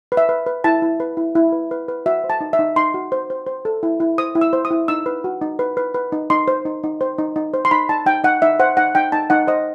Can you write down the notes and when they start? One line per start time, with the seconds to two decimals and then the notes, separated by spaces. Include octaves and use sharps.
0.12 B4
0.17 E5
0.29 B4
0.47 B4
0.64 E4 A5
0.82 E4
1.00 B4
1.17 E4
1.35 E4
1.52 B4
1.71 B4
1.88 B4
2.06 F#4 E5
2.24 C5
2.30 A5
2.41 D#4
2.53 E5
2.59 D#4
2.76 D#4 C6
2.94 F#4
3.12 C5
3.30 C5
3.47 C5
3.65 A4
3.83 E4
4.00 E4
4.18 C5 D#6
4.35 E4
4.41 E6
4.53 C5
4.65 D#6
4.71 E4
4.88 D#4 E6
5.06 B4
5.24 F#4
5.41 D#4
5.59 B4
5.77 B4
5.94 B4
6.12 D#4
6.30 D#4 C6
6.48 C5
6.65 D#4
6.83 D#4
7.01 C5
7.18 D#4
7.36 D#4
7.54 C5
7.65 C6
7.71 D#4 B5
7.89 D#4 A5
8.06 D#4 G5
8.24 D#4 F#5
8.42 D#4 E5
8.60 C5 F#5
8.77 D#4 F#5
8.95 D#4 G5
9.12 D#4 A5
9.30 D#4 F#5
9.47 C5 D#5